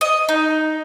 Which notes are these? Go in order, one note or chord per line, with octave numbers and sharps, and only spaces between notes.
D#5
D#4